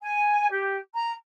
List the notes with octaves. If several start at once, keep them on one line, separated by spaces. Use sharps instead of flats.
G#5
G4
A#5